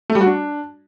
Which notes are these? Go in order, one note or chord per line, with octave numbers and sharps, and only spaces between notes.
A3
G3
F#4
D4